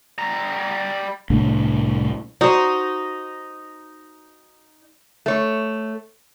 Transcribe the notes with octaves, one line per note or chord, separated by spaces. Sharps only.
G3 A#5
C2 A2 D4
D#4 F#4 C5
A3 C#5